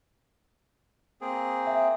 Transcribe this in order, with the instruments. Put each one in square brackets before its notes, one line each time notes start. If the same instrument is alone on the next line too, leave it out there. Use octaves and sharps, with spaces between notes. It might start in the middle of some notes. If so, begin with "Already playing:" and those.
[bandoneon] A#3 C4 G#4
[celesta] E5